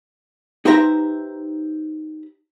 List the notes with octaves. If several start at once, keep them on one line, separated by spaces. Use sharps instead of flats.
D#4 G4 B4 C5 E5 A#5